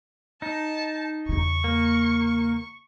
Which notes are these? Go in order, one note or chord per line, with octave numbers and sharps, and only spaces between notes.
D#4 A5
E2 C#3 C#6
A#3